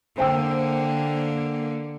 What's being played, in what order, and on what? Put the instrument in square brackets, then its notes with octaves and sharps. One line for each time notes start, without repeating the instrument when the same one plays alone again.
[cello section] D3 A#3 [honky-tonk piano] C5 G5 E6